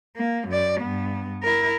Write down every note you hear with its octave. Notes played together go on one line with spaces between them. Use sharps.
A#3
F#2 D5
G2 B3
E4 A#4